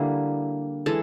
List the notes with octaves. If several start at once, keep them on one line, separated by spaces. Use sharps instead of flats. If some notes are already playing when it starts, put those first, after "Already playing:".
Already playing: D3 G3 A#3 E4
E3 G#3 A4